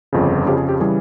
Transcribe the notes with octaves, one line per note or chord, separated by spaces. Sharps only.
G1 F2 C#3
F2 C#3 F3 G4
G#4
G4
C#3 E3 G3 G#4